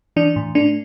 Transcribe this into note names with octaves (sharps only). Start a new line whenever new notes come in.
E3 D4
A2
A3 D4